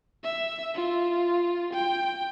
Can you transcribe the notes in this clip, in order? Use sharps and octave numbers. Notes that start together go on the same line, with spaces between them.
E5
F4
G5